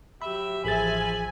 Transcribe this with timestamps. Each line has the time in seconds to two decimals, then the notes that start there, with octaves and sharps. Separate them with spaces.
0.22 F#3 G4 E5 B5
0.65 A1 F3 G#4 E5 G#5 B5 A6